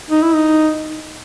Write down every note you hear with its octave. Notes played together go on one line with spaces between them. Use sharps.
D#4
E4
D#4